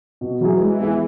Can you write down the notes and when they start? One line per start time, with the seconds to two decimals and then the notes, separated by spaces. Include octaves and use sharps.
0.21 B2
0.40 E3 F#3 E4 G#4
0.61 G#3
0.80 B3 E4 G#4